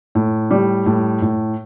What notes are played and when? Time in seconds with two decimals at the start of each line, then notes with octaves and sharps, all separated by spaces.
0.15 A2
0.51 G3
0.86 A2
1.22 A2